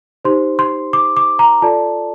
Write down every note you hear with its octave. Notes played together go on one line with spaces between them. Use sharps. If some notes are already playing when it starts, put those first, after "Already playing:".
D#4 G4 C5 C6
C6
D6
D6
A#5
F4 A4 D5 A5